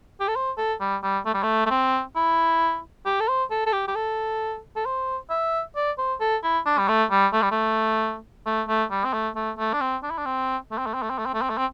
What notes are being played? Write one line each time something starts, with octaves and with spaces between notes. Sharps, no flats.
G4
A4
C5
A4
G3
G3
A3
G3
A3
A3
C4
E4
G4
A4
C5
A4
A4
G4
G4
A4
A4
C5
E5
D5
C5
A4
E4
D4
G3
A3
G3
A3
G3
A3
A3
A3
G3
C4
A3
A3
A3
D4
C4
D4
E4
D4
C4
A3
C4
A3
C4
A3
C4
A3
C4
A3
C4
A3
C4